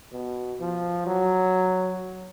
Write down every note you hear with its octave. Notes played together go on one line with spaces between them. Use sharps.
B2
F3
F#3